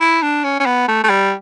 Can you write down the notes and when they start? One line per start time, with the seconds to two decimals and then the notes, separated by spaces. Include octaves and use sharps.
0.01 E4
0.22 D4
0.44 C#4
0.60 C#4
0.66 B3
0.88 A3
1.04 A3
1.09 G3